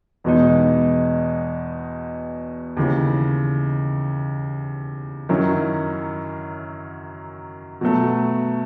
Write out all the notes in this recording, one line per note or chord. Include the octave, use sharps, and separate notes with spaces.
E2 B2 G#3 D#4
D#2 C#3 E3
F#2 D#3 F#3 C#4 E4
B2 F#3 A3